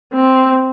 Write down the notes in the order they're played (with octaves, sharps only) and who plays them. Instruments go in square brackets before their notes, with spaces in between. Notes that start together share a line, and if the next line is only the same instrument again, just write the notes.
[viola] C4